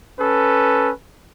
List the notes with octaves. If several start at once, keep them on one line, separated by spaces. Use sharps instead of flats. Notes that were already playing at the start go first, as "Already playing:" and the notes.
C#4 A4 B4